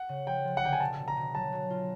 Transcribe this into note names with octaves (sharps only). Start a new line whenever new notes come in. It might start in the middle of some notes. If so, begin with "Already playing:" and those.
Already playing: F#5
C#3
F3 G5
F3
F#5
D3 G5
G#5
B2 A5
B2
A#5
B2
F#3 A5
F#3
F4